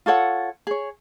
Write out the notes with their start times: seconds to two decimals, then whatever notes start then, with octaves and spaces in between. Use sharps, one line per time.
0.06 F4 A4 C#5 F#5
0.67 G#4 C#5